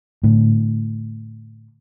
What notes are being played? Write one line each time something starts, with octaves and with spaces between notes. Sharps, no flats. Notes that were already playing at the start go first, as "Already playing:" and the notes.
A2 D3